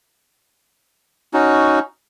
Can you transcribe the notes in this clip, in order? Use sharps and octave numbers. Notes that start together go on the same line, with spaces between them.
C#4 D#4 F#4